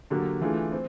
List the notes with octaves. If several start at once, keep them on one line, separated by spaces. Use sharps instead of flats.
D3 F#3 A#3 D4 G4
E3 A3 D4 F4 G#4
C4